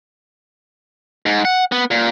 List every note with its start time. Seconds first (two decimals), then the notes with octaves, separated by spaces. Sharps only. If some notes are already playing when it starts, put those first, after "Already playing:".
1.26 G#2
1.45 F#5
1.72 B3
1.91 A#2